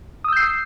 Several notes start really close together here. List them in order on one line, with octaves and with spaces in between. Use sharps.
D#6 E6 G6 C7